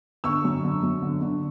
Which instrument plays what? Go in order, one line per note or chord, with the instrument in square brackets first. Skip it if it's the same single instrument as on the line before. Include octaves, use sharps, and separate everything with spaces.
[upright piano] D3 C#6 E6
F#2
D3
F#2
D3
D3